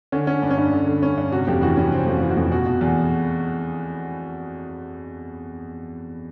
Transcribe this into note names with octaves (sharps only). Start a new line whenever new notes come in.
D3 C#4
D3 C#4
G2 D4
C#4
G2 D4
D3
D3
G2 C#4
G2
C3 F#4
F2 G4
E3 F#4
F2 C#4
C3 C4
F2 F#4
E3 F4
F#4
F2
B2 F#4
B2
E2